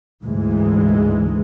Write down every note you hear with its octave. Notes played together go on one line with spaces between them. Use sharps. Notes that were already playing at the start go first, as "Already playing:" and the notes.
D2 G#2 E3 G#3